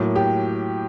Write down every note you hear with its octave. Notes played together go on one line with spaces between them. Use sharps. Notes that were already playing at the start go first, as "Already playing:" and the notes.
Already playing: A2 F#3 A#3
G4